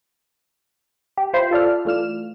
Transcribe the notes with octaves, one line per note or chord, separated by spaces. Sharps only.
G4
E4 F4 C5 B5
F4 A4 D5 F6
E3 A3 F4 D5 F6 E7